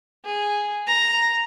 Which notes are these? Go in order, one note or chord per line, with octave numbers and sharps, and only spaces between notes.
G#4
A#5